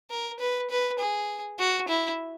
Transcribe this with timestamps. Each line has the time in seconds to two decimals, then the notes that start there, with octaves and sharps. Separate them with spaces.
0.11 A#4
0.40 B4
0.70 B4
0.99 G#4
1.59 F#4
1.88 E4